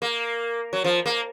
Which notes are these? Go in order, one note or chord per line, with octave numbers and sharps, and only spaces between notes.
A#3
F#3
F3
A#3